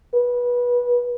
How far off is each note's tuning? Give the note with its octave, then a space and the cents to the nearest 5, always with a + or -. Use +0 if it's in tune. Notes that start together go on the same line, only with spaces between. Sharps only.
B4 -20